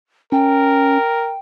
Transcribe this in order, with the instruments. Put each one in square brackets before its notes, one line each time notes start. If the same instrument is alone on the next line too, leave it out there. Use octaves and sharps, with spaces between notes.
[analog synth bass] C#4 [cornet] A#4 [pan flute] G5